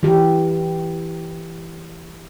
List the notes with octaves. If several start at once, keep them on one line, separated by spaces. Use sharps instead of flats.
E3 G4